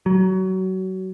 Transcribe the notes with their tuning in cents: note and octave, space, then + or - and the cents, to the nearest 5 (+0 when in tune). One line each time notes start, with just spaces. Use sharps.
F#3 +25